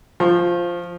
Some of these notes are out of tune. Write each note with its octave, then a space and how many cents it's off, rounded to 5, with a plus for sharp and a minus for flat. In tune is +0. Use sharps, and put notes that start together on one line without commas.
F3 +0 C#6 -40